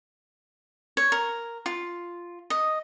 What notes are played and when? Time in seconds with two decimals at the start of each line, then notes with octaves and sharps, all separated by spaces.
0.97 C#5
1.12 A#4
1.66 F4
2.50 D#5